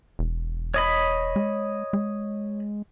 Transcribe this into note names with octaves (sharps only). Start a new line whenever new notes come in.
E1
C#5 D#5 B5
G#3
G#3